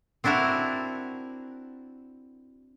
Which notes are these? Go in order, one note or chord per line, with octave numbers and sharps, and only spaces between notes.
C4 D4 E4 F#4 A#4